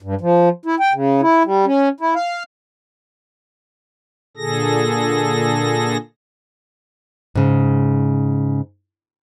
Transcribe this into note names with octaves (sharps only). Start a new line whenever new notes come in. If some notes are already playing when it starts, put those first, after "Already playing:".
G2
F3
E4
G5
C#3
E4
G3
C#4
E4
F5
A#2 D3 G#4 A4 A#6
G#2 C#3